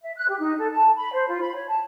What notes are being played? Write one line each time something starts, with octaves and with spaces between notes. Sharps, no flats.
E5
F#6
G4
D#4
A4
A5
B5
C5
F4
B5
C#5
A5